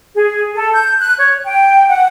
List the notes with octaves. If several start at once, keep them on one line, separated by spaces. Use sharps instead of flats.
G#4
A4
G6
F#6
C#5
G5
F#5